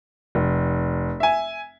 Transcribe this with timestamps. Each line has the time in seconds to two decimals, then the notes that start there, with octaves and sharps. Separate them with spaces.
0.35 F1
1.20 E5 G#5